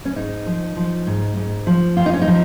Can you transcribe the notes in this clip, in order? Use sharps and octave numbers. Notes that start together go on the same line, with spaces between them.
C#4
G#2 D#4
F3
F3
G#2
G#2
F3
F2 F4
D#4
C#4
D#4
F3